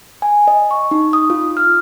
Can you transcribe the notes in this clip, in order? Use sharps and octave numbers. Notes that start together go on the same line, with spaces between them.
G#5
D#5
C#6
D#4
D#6
F4
F6